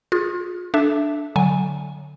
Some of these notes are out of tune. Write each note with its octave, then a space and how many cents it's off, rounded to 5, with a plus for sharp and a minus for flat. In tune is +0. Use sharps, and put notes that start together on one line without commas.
F4 +30 G#4 -5
D4 +0 A4 -20 E5 +0
D3 +0 F#3 +0 G#5 -10